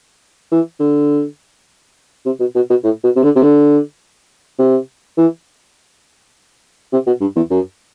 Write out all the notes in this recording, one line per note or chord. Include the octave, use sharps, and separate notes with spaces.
E3
D3
C3
B2
B2
B2
A2
B2
C3
D3
C3
D3
C3
E3
C3
B2
G2
E2
F#2